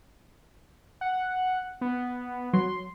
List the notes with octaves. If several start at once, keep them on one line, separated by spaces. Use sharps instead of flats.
F#5
B3
F#3 C6